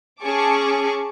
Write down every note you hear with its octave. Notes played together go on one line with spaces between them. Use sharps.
C#4 G#4 A5 C#6 D6